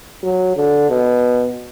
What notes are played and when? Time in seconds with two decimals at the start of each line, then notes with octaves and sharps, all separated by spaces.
0.23 F#3
0.56 D3
0.89 B2